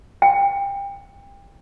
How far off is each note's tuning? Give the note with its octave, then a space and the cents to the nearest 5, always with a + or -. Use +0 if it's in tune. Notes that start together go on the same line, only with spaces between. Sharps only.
G5 +25